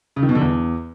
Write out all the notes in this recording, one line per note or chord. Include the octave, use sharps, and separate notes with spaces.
C#3
D#3
B2
D3
E2